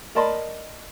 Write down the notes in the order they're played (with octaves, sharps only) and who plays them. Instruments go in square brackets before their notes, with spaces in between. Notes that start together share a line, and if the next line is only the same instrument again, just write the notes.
[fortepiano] A#4 D5 D#5 A5 B5 C6